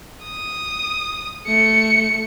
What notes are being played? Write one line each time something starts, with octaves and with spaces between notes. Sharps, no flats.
D#6
A3 C#7